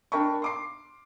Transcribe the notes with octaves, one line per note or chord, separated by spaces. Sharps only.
D4 A#4 G5 A5 B5 C#6
C6 D6 C7